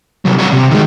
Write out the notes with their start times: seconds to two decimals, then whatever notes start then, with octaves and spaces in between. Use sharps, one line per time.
0.25 C3 F#3
0.39 G3 C#5
0.52 C3
0.71 D#3 G#3